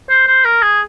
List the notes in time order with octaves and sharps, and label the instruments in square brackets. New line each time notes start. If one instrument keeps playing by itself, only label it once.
[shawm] C5
C5
A#4
G#4